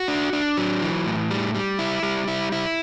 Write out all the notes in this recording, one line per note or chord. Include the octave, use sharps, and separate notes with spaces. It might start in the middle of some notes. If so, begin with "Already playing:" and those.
Already playing: F#4
D4
D4
F#3
E3
A2
G3
G3
E4
G3
E4
E4